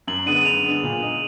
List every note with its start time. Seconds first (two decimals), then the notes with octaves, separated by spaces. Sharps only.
0.07 F#2 F#7
0.26 D3 G#3 B3 D#7
0.45 F#2 F7
0.65 D3 G#3 B3
0.84 A#2
1.02 G#3 D#4